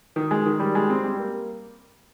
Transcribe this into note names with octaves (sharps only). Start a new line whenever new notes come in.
D#3
G#3
D#3
G3
G#3
C4
G3
A#3